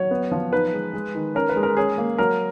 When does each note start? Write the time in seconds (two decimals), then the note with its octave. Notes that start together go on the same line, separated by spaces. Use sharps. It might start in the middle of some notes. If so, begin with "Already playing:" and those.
Already playing: F#3 C#5
0.11 B3
0.32 F3
0.53 D#4 B4
0.73 G#3
0.93 G#3
1.15 D#3
1.35 C#4 A#4
1.49 B4
1.56 G#3
1.63 A#4
1.77 C#4 G#4
1.98 A#3
2.18 F#3 A#4